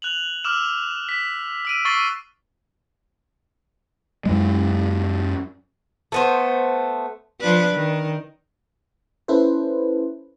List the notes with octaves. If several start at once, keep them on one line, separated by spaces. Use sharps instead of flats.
F#6 F7 F#7
D6 E6 F6 E7
B6
E6 D7 D#7
C#6 E6 A6 C7 G7
F#2 G#3
A3 B3 C5
F3 D4 B4
D#3
C#4 E4 A4 B4 C5